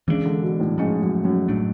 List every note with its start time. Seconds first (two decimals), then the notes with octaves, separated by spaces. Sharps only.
0.08 C#3 E3 G#3 B3 D4
0.25 D3
0.43 B2
0.60 A2
0.78 G#2 F3 A3 C#4
1.01 F#2
1.25 F#2
1.48 A2 F#3 A3 D4